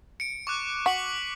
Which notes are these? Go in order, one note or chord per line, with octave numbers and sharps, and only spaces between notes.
C#7 D7
C#6 D6 F#6
F#4 B6 C#7 F#7